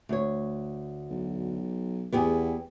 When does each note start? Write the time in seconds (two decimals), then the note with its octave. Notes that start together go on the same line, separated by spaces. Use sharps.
0.09 D2 C#5
1.10 B1
2.13 E2 B3 G4 G#4